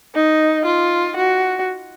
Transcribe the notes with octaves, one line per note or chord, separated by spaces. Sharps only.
D#4
F4
F#4